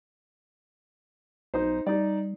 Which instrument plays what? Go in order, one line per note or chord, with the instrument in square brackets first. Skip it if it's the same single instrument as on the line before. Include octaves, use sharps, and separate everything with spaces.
[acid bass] B1 [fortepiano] D#4 C5
[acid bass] G3 [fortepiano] D#4 D5